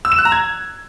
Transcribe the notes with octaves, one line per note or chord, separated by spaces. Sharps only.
E6
E7
F#6
A#5
G#6